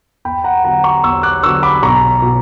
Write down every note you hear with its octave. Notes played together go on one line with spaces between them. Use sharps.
E2 G5 B5
F#5 A#5
D3 F#3 B3 F#5 A#5
A#5 C#6
E2 C#6 E6
D6 F#6
D3 F#3 B3 C#6 E6
B5 D6
B1 A#5 C#6
B2 F#3